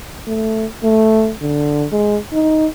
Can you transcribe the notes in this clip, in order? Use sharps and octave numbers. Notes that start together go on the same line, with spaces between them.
A3
A3
D3
G#3
D#4